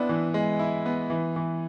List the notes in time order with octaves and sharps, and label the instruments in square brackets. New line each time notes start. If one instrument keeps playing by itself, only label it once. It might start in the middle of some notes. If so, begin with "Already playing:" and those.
Already playing: [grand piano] B3 E4 [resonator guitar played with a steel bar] C4 D4
[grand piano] E3
G#3
E4
B3
E3
E3